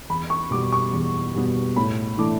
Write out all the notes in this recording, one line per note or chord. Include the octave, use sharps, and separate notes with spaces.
E2 B5
C#6
B2 G3 B3 D6
C#6
E2
B2 G3 B3
A2 B5
E3 A3 D4 D6